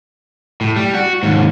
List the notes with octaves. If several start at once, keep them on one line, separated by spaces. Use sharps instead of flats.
A2
G3
F#4
D#2 G#2